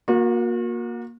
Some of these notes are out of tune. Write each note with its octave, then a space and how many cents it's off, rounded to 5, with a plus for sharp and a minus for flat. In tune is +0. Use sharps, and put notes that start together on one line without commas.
A#3 +15 F#4 -35